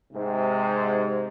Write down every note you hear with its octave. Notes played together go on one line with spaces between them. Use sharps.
G#2 C3